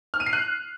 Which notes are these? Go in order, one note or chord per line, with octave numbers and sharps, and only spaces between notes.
F6
D#7
C7
F#6